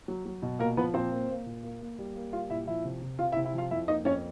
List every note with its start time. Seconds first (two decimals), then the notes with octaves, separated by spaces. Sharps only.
0.08 F#3
0.26 F#3
0.42 B2
0.59 A#2 A#3 A#4
0.77 F3 B3 B4
0.94 A#2 C4 C5
1.12 A#3
1.29 A#3
1.46 A#2
1.63 A#3
1.81 A#3
1.99 G3
2.15 A#3
2.33 G3 F4 F5
2.50 A#2 E4 E5
2.67 F3 E4 E5
2.85 C3
3.02 C3
3.19 C3 F4 F5
3.32 E4 E5
3.36 C3
3.45 E4 E5
3.54 F3 F4 F5
3.71 F2 E4 E5
3.88 A#3 D#4 D#5
4.05 F2 C#4 C#5